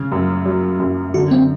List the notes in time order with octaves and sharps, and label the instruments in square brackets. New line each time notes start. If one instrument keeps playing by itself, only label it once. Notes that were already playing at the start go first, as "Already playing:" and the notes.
Already playing: [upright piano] C#3
F#2
F#3
F#2
[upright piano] D3 [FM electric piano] F#4
[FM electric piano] C4